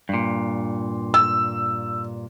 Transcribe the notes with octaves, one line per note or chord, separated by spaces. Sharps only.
G2 A#2
E6